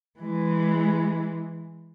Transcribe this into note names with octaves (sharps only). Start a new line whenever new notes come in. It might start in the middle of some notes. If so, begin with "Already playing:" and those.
E3 G#3